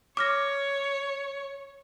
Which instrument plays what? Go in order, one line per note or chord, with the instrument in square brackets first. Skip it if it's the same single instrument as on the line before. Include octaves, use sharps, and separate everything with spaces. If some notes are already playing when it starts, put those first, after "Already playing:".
[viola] C#5 [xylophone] D6 F6 A#6